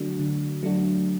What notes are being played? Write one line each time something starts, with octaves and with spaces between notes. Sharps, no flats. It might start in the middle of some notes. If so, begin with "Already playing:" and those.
Already playing: D3 F#3 A3 D4 F#4
D3
F#3 A3 D4 F#4